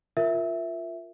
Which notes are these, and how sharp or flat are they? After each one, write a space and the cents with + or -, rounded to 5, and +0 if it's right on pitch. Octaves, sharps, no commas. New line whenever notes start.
F4 +0 A#4 +0 E5 +0